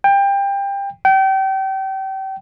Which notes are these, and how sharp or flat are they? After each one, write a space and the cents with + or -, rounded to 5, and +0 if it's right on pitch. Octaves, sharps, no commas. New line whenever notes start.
G5 +25
G5 -30